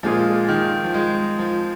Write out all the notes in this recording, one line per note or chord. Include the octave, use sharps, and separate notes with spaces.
A#2 F3 G#3 F4 G#4
D#3
F3
G#3
F3